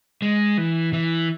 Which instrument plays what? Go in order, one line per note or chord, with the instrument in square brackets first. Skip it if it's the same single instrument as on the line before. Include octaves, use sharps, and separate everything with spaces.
[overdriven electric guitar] G#3
E3
E3